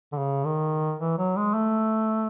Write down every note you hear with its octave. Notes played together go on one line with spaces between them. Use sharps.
D3
C#3
D#3
E3
F#3
G#3
A3